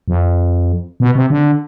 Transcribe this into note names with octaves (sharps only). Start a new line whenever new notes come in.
F2
B2
C3
D3